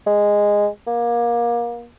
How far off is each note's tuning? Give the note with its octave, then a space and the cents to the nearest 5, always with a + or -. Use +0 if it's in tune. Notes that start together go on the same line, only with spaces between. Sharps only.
G#3 -10
A#3 +25